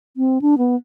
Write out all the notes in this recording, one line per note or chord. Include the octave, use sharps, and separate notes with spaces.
C4
D4
B3